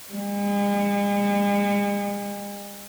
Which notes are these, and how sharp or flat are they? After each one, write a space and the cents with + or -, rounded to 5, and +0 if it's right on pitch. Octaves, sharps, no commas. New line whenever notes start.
G#3 -45